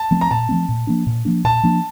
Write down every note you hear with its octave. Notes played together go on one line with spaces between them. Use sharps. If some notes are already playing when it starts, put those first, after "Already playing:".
Already playing: A5
F3 A3 C4
A#5
A#2 A5
F3 A3 C4
A#2
F3 A#3 D4
A#2
F3 A#3 D4
A#2 A5
F3 A#3 D4